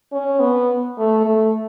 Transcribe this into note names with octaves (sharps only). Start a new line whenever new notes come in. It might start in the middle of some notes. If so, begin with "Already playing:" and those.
C#4
B3
A3
A3